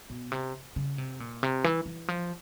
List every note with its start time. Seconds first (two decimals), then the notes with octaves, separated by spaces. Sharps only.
0.10 B2
0.32 C3
0.76 C#3
0.98 C3
1.20 A#2
1.43 C3
1.64 E3
1.86 E3
2.08 F3